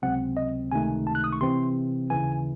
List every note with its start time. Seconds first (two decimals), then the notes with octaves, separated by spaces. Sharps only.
0.02 C#2 C3 F#3 C4 F#5
0.37 D#5
0.72 C#2 C3 D#3 A3 D#4 G#5
1.07 A5
1.15 F#6
1.24 D#6
1.32 C#6
1.41 C3 E3 C4 C6
2.10 D#2 C#3 E3 G#5